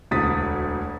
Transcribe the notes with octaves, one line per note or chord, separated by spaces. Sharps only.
E1 D2 D#6 A6 B6